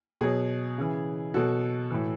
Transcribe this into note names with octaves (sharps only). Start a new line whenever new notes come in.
B2 F#3 G#4
C#3 E3
B2 F#3 F#4 A4
A2 E3